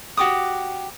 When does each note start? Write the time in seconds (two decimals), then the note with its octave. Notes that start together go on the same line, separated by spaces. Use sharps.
0.17 F#4 G4 D6 D#6